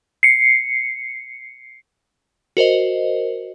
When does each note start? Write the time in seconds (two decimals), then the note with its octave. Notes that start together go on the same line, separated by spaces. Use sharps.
0.23 C7 C#7
2.57 F#4 A#4 C5 D#5